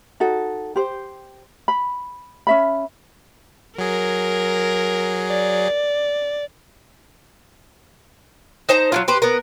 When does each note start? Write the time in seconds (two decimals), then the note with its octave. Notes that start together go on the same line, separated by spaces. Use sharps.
0.20 D#4 F#4 A4
0.76 G4 C5
1.68 B5
2.47 C#4 E5 B5
3.79 F#3 G#4 A#4
5.27 D5
8.69 D#4 C5 A5 A#5
8.92 F#3 E4 F4
9.08 G4 B4 C5
9.22 B3 A#4